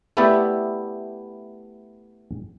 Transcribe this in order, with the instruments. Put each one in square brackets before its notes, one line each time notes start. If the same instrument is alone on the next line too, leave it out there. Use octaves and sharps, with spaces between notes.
[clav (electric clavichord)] A3 B3 E4 G4 D5 E5